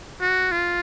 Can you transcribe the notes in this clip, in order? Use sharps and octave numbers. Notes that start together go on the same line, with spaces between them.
F#4
F4